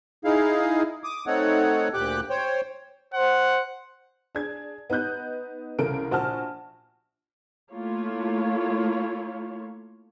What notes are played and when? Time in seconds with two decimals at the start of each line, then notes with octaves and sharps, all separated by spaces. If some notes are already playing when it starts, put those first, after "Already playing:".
0.25 D#4 E4 G#4 F5
1.04 D6 D#6
1.27 A3 C4 D#4 A4 C#5 F#5
1.94 D2 A#2 G4 G5 D6 F#6
2.30 C5 C#5 G5
3.14 C5 F#5
4.35 D4 G#4 G#6
4.90 B3 D#4 B4 F#6 G6
5.79 C2 C#3 A4 A#4 D7
6.11 A#1 F#4 A5 F6
7.73 A3 A#3 E4 F4 C#5